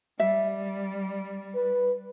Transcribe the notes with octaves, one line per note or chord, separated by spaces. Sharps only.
G3 E5
B4